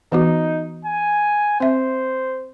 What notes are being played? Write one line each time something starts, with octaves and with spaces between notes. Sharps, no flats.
E3 B3 D#4 F#4
G#5
C4 C5 E5